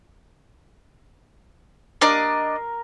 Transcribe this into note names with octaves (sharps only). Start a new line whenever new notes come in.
D4 A#4 D5 D#5